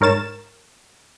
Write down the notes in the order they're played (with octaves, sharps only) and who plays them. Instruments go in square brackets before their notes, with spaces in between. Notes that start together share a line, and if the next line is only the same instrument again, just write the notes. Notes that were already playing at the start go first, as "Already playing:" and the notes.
[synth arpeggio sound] G#2 A#4 C#5 A6 E7